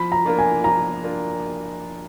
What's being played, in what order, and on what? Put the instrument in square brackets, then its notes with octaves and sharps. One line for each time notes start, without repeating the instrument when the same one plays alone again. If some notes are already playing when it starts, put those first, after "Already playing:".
Already playing: [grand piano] F3 [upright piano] B5
[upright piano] A#5
[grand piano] A#3 D4 F4 A#4
[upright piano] G#5
[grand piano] F3 [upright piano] A#5
[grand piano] A#3 D4 F4 A#4